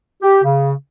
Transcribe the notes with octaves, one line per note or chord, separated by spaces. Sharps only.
G4
C#3